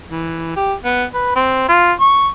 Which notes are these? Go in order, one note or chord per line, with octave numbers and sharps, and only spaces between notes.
E3
G4
B3
B4
C4
F4
C#6